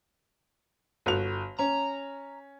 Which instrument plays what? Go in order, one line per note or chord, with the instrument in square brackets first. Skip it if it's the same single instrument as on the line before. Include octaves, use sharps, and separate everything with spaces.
[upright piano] G1 F#4 F7
[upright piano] C#4 [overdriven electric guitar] A#5